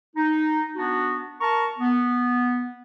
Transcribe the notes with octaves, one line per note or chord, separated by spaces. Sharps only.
D#4
B3 D4 F#4
A#4 A5 A#5 C#6
B3